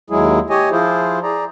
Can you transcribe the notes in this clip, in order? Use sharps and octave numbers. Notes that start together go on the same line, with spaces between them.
D#2 F#3 G#3 E4 G#4
G4 C#5 D#5 G#5
F3 E4 F4 G#4 C5
G#4 D5 A#5